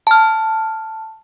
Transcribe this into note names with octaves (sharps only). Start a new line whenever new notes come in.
A5 F6